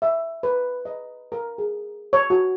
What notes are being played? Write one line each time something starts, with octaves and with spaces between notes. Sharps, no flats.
E5
B4
D#5
A#4
G#4
C#5
F#4